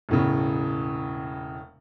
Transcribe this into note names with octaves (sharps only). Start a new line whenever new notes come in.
E1 A2 C#3